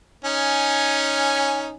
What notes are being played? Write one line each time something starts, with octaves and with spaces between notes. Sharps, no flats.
C#4 D#4 G#5